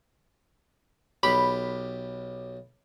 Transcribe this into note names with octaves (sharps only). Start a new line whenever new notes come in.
B1 G4 B5